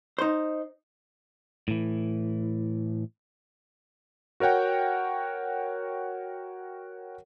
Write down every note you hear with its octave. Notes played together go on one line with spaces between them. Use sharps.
D#4 C5
A2 E3
F#4 A#4 C#5 F#5 G5